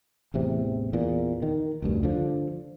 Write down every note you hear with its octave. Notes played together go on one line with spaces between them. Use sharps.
A1 E2 C3
E2 A#2
D#3
F1 D2 G2
D3 F3